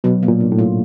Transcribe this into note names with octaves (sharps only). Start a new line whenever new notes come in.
B2 F#3
A#3
A#2
D4
A2
F4